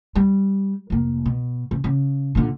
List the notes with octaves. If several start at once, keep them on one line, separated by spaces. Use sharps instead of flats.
G3
F1 A#3
B2
C#3
C#3
A#2 D3